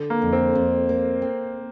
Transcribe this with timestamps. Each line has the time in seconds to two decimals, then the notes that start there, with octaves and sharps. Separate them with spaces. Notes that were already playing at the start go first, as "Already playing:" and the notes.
Already playing: D3
0.10 A#3
0.22 F2
0.33 C4
0.55 F2
0.89 A#3
1.22 C4